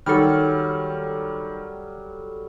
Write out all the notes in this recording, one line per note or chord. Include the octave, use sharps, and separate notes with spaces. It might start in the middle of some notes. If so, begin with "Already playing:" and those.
D#3 F#3 G3 A4 F6